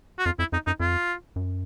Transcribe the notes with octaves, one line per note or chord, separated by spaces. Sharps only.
F#4
F2 F4
F2 E4
F2 D#4
F#2 D#4
F2 F4
F#2